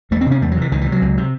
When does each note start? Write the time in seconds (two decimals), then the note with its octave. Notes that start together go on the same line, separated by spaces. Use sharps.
0.11 E2 A3
0.21 C4
0.26 C3 C#4
0.42 E2 A3
0.52 F#3
0.57 C3 E3
0.72 C#2 D#3
0.81 E3
0.86 C3
0.92 F#3
1.02 C#2
1.17 C3